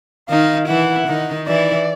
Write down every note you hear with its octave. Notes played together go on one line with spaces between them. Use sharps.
D#3 D#4 F5
E3 E4 F#5
D#3 D#4
E3 E4 D5